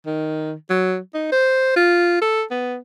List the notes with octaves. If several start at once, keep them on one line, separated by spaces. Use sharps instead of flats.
D#3
F#3
D#4
C5
F4
A4
B3